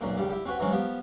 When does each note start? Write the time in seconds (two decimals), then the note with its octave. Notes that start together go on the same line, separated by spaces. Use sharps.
0.01 B1 F#2 A#2
0.17 C#2 G3 D5
0.30 E4 G4
0.46 C4 C#4 F#4 B4
0.59 E3 F#3 G#3 C4 C#4
0.72 F3 B3 G4